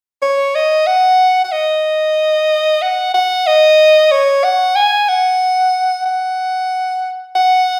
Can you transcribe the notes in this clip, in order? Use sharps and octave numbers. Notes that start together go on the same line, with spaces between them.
C#5
D#5
F#5
F#5
D#5
F#5
F#5
D#5
C#5
F#5
G#5
F#5
F#5
F#5